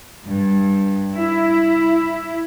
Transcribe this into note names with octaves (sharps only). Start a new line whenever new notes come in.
G2
E4